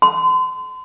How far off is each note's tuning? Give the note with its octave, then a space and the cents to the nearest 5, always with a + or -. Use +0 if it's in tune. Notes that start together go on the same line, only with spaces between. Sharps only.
C6 -40